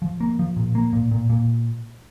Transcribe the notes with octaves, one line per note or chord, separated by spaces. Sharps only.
F3
A#3
F3
A#2
A#3
A#2
A#2
A#2